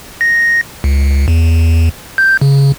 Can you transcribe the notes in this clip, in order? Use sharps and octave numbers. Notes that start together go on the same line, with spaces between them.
A#6
C#2
E2
G6
C#3